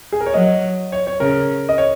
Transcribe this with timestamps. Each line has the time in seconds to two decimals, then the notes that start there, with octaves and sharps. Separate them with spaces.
0.12 G#4
0.20 A#4
0.26 C#5
0.34 F#3 D#5
0.92 C#5
1.07 C#5
1.20 C#3 A#4
1.69 D#5
1.78 C#5